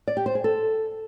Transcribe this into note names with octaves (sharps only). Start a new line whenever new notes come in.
D5
G4
C5
G#4
A4